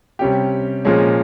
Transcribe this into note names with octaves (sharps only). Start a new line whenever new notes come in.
C3 G3 C#4 G4
A#2 F3 G#3 C#4